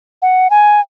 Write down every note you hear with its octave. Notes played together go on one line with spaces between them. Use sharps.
F#5
G#5